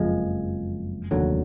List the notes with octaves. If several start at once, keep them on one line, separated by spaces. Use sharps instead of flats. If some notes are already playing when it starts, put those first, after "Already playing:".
Already playing: F#1 F2 F3 G#3
F1 D#2 D3 F#3